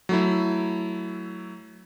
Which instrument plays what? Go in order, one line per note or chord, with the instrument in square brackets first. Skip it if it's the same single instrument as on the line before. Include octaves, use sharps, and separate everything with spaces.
[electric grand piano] F#3 A3 E4